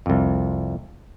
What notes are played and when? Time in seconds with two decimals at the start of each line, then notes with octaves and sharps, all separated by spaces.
0.06 C2 F2